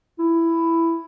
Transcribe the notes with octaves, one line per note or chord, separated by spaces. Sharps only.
E4